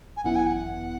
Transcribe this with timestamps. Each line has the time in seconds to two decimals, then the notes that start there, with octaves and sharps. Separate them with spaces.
0.17 G#5
0.24 G#1 F#2 E3 B3 E4 F#5
0.36 G#5
0.47 F#5